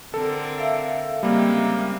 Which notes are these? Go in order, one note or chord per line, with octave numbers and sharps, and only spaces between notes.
D3 C4 A4 A#4
E5 F5
C#3 G3 G#3 A#3 C4